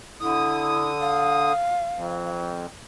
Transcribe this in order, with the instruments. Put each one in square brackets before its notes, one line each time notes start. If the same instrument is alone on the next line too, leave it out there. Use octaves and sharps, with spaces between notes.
[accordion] D3 D#6 [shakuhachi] E4
[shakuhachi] F5
[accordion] F2